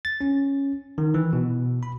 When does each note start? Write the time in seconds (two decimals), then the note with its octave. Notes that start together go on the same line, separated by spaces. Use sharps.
0.05 A6
0.21 C#4
0.98 D#3
1.14 E3
1.33 B2
1.83 B5